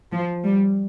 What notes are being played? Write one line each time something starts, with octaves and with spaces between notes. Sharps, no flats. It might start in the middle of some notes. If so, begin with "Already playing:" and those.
F3
G3